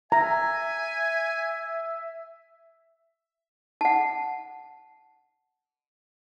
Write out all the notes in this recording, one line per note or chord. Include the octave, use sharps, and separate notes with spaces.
E5 G#5 A#5
F#5 A5